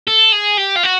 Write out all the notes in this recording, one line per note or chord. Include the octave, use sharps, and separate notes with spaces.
A4
G#4
G4
F4
F#4